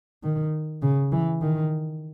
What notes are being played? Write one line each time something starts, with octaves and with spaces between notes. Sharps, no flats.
D#3
C#3
E3
D#3